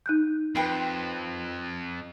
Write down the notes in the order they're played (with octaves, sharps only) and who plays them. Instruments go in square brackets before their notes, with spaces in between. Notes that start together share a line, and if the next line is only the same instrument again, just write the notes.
[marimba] D#4 F#6 G6
[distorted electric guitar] F2 [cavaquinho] B4 G5 C6